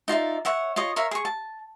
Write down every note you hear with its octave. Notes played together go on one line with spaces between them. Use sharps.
D#4 F4 D5 E5
C#5 E5 F#5
F4 C#5 D#5
A#4 C#5 E5 F5
G#4 C#6
A5